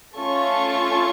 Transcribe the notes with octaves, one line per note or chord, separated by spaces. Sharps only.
A3 C#4 F4 A4 C#6